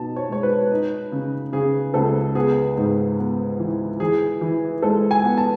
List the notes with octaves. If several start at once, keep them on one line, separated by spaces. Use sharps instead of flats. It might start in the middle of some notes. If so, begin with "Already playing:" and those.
Already playing: B2 D#4 A5
C#5
G#3 C#5
B4
D#4
C#3
C#3 G#4
C#2 A4
B3 G#4
G#2 G#4
B3
E3
E3 G#4
E3
G#3 A4
G#5
B3
A5